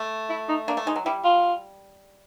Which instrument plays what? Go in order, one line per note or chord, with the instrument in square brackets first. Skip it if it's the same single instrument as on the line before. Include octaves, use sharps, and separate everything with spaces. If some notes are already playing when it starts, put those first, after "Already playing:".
Already playing: [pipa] A3
[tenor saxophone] E4
D#4
[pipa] A#3 [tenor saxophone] D4
[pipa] A3
[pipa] G#3 [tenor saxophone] D#4
[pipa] F#3
[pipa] G3 [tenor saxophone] E4
[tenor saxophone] F4